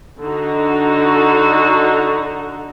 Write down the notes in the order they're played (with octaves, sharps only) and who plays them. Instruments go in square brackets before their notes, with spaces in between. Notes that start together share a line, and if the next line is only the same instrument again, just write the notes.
[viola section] D3 D#4 F#4